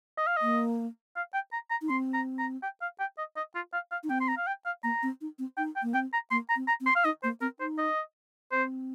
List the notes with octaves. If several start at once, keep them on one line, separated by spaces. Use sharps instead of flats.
D#5
F5
D#5
A#3
F5
G5
A#5
A#5
D#4
C4 C6
A#5
A#5
G5
F5
G5
D#5
D#5
F4
F5
F5
D#4
C4 G5
C6
A#5
F5
G5
F5
A#3 A#5
C4
D#4
C4
D#4 G5
G5
A#3
C4 G5
A#5
A#3 C6
A#5
C4
A#5
C4
C6
F5
D#4 D#5
A#3 C5
C4 A#4
D#4 C5
D#5
C4 C5